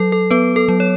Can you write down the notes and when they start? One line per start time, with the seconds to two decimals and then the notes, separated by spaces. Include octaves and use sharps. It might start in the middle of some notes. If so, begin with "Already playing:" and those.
Already playing: F#3 A4
0.12 A4
0.31 B3 B4
0.56 A4
0.69 F#3
0.80 C#5